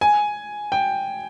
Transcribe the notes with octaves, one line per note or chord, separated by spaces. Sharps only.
G#5
G5